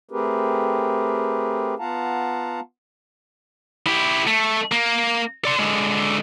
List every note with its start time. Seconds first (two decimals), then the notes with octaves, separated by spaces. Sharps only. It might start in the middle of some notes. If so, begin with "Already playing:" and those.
0.11 A3 C4 G4 G#4 A#4 B4
1.79 B3 F4 F5 F#5 A5 A#5
3.87 E4 G4
4.27 A3
4.72 A#3
5.45 D5 C6
5.59 D3 G#3